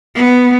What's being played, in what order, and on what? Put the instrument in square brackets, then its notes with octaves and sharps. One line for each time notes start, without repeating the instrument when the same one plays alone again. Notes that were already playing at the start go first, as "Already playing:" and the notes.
[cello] B3